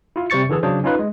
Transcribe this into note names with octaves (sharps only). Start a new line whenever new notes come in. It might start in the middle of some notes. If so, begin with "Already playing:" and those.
E4 F4
C3 G3 C5 C#6 A6 C#7
D3 E3 G#4 A4
C#3 F#3 D4 G#4 C5
C#4 D#4 F4 B4
G#3